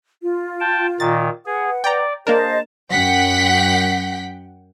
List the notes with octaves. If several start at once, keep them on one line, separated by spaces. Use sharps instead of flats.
F4
G5 A5
A#2 D#3 A6
G#4 B4 F#5
D5 G5 A#5
A#3 D4 G#4 A#4 C5 D#5 A5
F#2 F#5 G5 B6